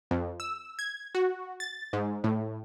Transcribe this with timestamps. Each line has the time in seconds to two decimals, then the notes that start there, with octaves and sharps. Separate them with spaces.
0.11 F2
0.40 E6
0.79 G#6
1.15 F#4
1.60 A6
1.93 G#2
2.24 A2